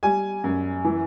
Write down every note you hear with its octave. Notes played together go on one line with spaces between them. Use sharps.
G3 G#5
F#2
E3